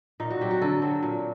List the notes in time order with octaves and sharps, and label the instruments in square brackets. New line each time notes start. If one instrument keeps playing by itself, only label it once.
[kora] A#2 D#4
F#4
F#3 C4 G4
F#4
D3 A4
F#3 C4
A#2